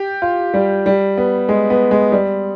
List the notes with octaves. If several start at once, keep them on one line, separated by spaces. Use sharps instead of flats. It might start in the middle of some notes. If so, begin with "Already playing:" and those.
Already playing: G4
F4
G3
G3
B3
G#3
B3
G#3
G3